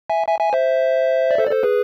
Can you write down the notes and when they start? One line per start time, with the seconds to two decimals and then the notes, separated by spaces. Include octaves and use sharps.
0.10 E5 G#5
0.28 E5 G#5
0.40 E5 G#5
0.53 C5 E5
1.31 D5
1.38 A4 C5
1.47 D5
1.51 A4 C5
1.63 G#4 B4